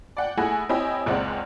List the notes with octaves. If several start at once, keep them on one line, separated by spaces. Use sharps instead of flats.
D5 F#5 G5
A3 E4 G#4 F#5 G#5 A#6
C4 E4 G4 C#5 D#5 G#5
F#1 C#2 G#3 C4 D5 F#5